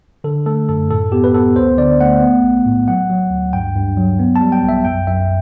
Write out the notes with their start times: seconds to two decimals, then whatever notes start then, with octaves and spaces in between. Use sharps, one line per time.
0.24 D3 A4
0.46 A3 A4
0.69 F#2 A4
0.90 A2 A4
1.12 B3 G4
1.24 B4
1.34 B3 A4
1.56 D2 C5
1.78 D3 D5
2.00 A3 F#5
2.21 B3
2.43 B1
2.66 A2
2.88 F#3 F#5
3.10 F#3
3.31 D2
3.53 G2 G5
3.76 G2
3.97 F#3
4.19 B3
4.36 A5
4.41 G3
4.52 G5
4.63 B1
4.69 E5
4.85 F#2 G5
5.07 F#2 E5